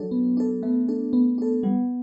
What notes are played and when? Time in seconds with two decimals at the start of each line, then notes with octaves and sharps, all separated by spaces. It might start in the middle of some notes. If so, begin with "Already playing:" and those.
Already playing: F#3 D4 A4
0.11 B3
0.37 D4 A4
0.63 A3 B3
0.88 D4 A4
1.13 B3
1.38 D4 A4
1.63 G3 B3